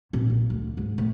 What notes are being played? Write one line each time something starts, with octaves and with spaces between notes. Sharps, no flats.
A#2 C4
A#1
D2
G#2
A2